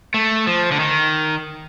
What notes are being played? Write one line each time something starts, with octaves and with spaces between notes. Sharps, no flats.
A3
F3
D3
D#3